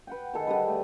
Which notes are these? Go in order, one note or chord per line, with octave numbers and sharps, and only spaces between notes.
B4 F#5 G5
D#3 G#4 A4 D#5
D3 G3 G#4 B4
A3